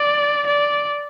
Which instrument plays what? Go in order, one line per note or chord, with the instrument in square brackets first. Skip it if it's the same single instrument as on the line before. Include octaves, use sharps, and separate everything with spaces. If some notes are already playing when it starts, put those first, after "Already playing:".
Already playing: [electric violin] D5
D5